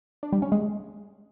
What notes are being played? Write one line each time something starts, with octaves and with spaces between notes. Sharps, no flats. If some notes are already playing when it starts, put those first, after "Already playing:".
D4
G3
C#4
G#3